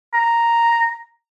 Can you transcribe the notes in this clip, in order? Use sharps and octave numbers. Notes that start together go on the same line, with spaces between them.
A#5